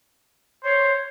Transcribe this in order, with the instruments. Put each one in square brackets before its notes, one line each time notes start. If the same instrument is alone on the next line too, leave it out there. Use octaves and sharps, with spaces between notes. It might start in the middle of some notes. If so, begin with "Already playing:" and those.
[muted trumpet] C5 [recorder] C#5